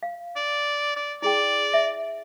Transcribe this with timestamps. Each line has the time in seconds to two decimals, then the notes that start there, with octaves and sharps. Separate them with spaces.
0.03 F5
0.36 D5
0.96 D5
1.22 E4 G#4 D5 G5
1.74 E5